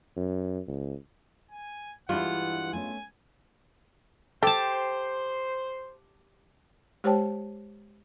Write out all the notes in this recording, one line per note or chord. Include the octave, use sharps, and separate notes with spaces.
F#2
C#2
G#5
G2 E3 G3 G#3 D4 E4 F4 F#5
A3 B3 C#4 G#5
G4 A4 C5 A5
G#3 G4 C5 C#5 G5 A5